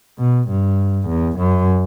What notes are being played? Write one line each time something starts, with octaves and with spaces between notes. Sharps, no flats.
B2
G2
E2
F#2